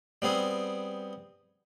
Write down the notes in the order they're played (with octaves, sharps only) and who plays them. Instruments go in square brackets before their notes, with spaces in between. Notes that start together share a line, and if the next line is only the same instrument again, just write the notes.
[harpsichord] G3 B3 C4 G#4